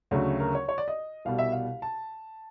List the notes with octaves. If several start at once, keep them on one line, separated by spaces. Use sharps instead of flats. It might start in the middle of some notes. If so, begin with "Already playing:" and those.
D2 C#3 F#3 A3
A#4
C#5
C#5
D5
D#5
C2 B2 G3 F5
E5
F5
A5